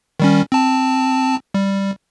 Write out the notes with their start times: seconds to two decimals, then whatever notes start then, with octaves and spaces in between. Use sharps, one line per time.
0.20 D#3 G3 C#4
0.52 C4 A5
1.54 G3